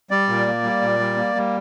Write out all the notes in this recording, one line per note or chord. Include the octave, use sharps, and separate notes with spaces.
G3 D5
A#2
A#3
G3
A#2
G3
A#3
G3